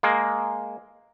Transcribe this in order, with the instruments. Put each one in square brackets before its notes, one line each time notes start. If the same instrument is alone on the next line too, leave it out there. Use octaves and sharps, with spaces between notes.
[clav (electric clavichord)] G#3 A#3